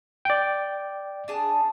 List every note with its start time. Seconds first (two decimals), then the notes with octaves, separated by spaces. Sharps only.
0.25 D5 G5
1.28 D4 G#4 A5